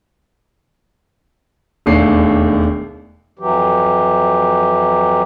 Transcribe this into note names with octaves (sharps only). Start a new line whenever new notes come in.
E1 D#2 A3 D4 C7
F2 E3 F#3 G4